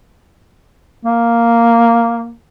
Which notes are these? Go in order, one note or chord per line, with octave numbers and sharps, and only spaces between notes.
A#3